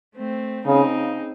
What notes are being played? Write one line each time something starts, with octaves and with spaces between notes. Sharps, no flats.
A3 C4
C#3 C4 D#4